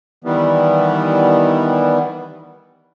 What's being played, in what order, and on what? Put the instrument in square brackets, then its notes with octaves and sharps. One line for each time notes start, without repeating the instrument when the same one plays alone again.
[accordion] D#3 E3 G3 B3